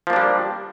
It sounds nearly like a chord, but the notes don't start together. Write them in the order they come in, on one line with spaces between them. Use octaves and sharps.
F3 A#3 D4 G3